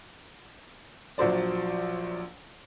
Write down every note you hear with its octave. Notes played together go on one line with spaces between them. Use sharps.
A#1 F3 F#3 C5 D5